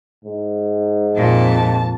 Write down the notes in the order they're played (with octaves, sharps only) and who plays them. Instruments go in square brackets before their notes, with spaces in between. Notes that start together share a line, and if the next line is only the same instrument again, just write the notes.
[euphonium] G#2
[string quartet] F2 A5 [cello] A#2